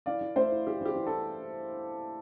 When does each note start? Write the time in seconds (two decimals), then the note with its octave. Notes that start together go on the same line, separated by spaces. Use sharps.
0.06 E3 D5 F5
0.21 E3
0.36 A3 C5 E5
0.52 E4
0.67 E3 G4
0.81 E3 G4
0.95 E3
1.06 E4 A4